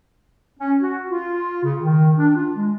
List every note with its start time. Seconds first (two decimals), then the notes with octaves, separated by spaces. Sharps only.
0.60 C#4
0.82 F#4
1.10 F4
1.64 C#3
1.82 D#3
2.18 D4
2.36 F4
2.56 G#3